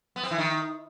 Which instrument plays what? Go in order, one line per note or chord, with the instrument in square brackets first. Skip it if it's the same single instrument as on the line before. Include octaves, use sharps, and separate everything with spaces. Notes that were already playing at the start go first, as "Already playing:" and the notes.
[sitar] B3
C4
E3
D#3